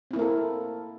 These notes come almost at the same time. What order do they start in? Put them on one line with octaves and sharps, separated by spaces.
C4 E4 A#3 A#4 A4